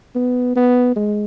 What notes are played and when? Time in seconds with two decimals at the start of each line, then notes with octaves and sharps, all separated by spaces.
0.15 B3
0.56 B3
0.96 G#3